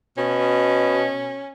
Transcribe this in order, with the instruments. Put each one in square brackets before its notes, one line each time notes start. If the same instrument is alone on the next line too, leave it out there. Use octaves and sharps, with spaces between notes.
[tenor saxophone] B2 [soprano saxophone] C#4